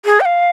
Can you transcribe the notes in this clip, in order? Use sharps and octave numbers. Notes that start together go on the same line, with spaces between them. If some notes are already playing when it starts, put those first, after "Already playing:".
G#4
G5
F5